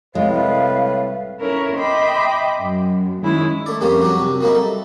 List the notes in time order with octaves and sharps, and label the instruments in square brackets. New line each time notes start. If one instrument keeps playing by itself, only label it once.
[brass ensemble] C2 B4 [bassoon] A2 [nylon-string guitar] G#3 [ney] F5
[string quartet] C#4 E4 A4 A#4 C#5
D#5 E5 G5 B5 C6 D6
F#2
D#3 G#3 C#4 E4
[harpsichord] A3 D5
F2 G3 A#3 C#4 G4 C5
F#3 C4 D4 F#4 G4
C3
F#3 G3 A#3 C4 D#4 E4
A4